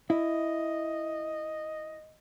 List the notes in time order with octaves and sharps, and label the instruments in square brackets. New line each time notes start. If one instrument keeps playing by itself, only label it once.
[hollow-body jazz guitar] E4 [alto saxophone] D#5